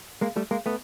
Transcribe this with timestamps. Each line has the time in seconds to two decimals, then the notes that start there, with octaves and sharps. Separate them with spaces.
0.21 G#3 A#3
0.36 G3 A3
0.51 G#3 A#3
0.66 A3 B3